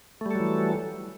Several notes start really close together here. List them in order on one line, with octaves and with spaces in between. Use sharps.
A3 G3 A4 F#3 E3